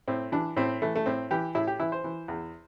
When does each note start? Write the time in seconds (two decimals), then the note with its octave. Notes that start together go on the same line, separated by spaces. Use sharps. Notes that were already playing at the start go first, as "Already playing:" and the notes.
0.08 A2 C4
0.32 E3 D4
0.57 A2 C4
0.82 E3 A3
0.96 A3
1.06 A2 C4
1.31 E3 G4
1.55 A2 E4
1.67 G4
1.80 E3 E4
1.92 C5
2.04 E3
2.28 E2